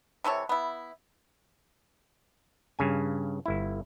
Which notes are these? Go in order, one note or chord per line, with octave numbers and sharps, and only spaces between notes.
C3 E3 A4 C#5
B3 E4
G2 C#3 G#5
G1 E4